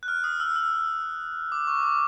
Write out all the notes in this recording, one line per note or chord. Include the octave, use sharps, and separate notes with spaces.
F#6
F6
D#6
E6
E6
D6
C#6
D6